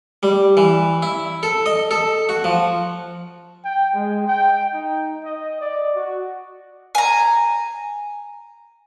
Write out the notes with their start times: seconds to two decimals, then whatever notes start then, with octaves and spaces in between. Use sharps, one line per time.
0.23 G3
0.57 E3
1.02 E4
1.43 A4
1.66 D#5
1.91 A4
2.29 F#4
2.44 F3
3.64 G5
3.94 G#3
4.27 G5
4.74 D#4
5.24 D#5
5.61 D5
5.95 F#4
6.95 G#5 A#5